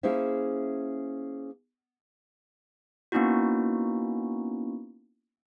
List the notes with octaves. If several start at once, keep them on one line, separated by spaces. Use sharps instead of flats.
A#3 C#4 E4 G#4 C5 E5
A#3 B3 C#4 D#4 E4 F#4